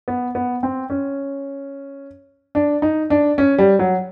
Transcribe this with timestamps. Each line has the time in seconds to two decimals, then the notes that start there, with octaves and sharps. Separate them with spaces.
0.08 B3
0.35 B3
0.63 C4
0.90 C#4
2.55 D4
2.82 D#4
3.10 D4
3.38 C#4
3.58 G3
3.79 F#3